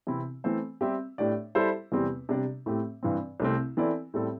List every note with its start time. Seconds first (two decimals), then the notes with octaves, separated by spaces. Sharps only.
0.07 C3 E3 C4 E4
0.44 E3 A3 C4 A4 C5
0.81 G3 C4 G4 E5
1.18 A2 A3 D4 G4 D5
1.55 G3 E4 A4 C5 E5
1.92 E2 C3 G3 C4 G4
2.29 C3 G3 D4 G4 D5
2.66 A2 A3 C4 G4
3.03 G2 E3 C4
3.40 C2 C3 A3 C4
3.77 E3 C4 E4 A4 D5
4.14 A2 G3 C4 A4